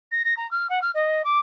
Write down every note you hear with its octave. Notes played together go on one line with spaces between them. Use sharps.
A#6
A#6
A#5
F6
F#5
F6
D#5
D6